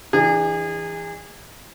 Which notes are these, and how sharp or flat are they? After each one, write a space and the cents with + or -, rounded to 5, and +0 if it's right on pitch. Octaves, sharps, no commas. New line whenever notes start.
E3 +0 D4 +35 G#4 -30